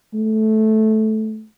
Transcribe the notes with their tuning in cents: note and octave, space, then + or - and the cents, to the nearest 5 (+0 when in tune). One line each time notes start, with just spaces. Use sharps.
A3 -10